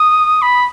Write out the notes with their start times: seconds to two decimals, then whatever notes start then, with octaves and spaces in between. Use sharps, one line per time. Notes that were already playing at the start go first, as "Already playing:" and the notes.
Already playing: D#6
0.42 B5